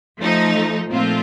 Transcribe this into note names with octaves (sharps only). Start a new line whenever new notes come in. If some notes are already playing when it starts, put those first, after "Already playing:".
F3 A3 D#4
A#2 F3 A3 C4 F4